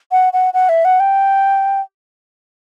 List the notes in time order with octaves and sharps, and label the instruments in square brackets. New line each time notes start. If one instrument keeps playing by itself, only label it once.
[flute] F#5
F#5
F#5
E5
F#5
G5